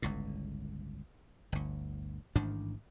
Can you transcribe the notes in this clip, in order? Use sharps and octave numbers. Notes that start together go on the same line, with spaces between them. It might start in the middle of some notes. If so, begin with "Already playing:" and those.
G1 C#2 A2
G1 D2
A1 G#2 D#3 D4